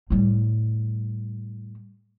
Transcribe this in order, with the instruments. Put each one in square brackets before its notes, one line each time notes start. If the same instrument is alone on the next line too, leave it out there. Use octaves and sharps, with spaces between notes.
[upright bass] A2 G3